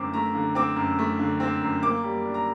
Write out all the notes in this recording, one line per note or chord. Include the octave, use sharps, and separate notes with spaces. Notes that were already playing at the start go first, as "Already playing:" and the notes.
Already playing: F#2 D3 A3 C4 D6
A3 A#5
D3
C4 D6
F#2
A3
D3
C4
F#2
A#3 D6
G3
D4
A#5